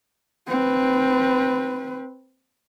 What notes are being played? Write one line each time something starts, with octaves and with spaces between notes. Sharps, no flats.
C4 B4